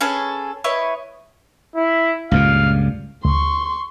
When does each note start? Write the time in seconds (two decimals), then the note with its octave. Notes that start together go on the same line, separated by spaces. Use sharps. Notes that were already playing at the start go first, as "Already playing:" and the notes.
0.01 C#4 G#4 A4 B4
0.64 E4 B4 C#5 D#5
1.76 E4
2.31 C#2 G2 A#2 F5
3.25 D2 C6 C#6